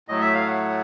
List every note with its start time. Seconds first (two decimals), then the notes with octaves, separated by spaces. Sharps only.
0.08 A2 F#3 A3 D#5
0.21 E5
0.34 F5
0.47 F#5